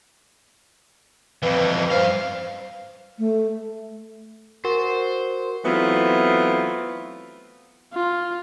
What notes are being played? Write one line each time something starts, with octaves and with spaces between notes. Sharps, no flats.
F2 E3 B4
G2 C5 F5
A3
F#4 A#4 C5
E3 F#3 A3 B3 C4 F4
F4